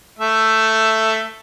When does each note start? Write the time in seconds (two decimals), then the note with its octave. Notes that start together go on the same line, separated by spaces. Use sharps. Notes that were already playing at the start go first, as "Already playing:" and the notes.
0.19 A3 E5